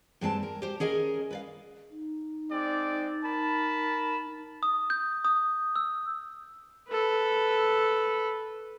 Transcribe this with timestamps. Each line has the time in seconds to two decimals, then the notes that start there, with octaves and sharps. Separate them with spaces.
0.21 G2 G#3 C4 A5
0.43 A#4
0.62 G4 C5
0.80 C#4 G#4 A#4 D#5
1.31 B4 D5 F5
1.91 D#4
2.52 G#3 C4 D5
3.25 A#4 A5 B5
4.63 D#6
4.90 G6
5.25 D#6
5.76 E6
6.89 A4 B4